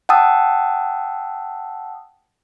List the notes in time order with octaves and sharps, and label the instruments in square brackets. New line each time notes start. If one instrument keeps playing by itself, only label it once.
[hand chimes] F#5 G5 A5 D#6 E6